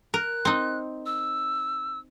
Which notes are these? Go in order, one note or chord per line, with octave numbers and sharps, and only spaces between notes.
A#4 F#6
C4 D#4
E6